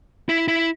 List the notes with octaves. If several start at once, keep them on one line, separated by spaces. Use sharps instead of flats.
E4
E4